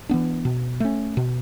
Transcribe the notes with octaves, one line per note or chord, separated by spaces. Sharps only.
E3 B3 D4
B2
A3 C#4
B2